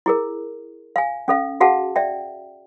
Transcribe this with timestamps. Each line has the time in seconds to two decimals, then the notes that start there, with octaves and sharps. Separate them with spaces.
0.06 E4 G#4 A#4
0.96 F5 G#5
1.28 C#4 A4 F5
1.61 F#4 G#4 F5 F#5 A5
1.96 D5 E5 G5